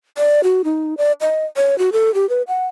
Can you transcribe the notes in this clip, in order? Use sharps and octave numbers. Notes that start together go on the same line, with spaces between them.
D5
F#4
D#4
D5
D#5
C#5
F#4
A4
G4
B4
F#5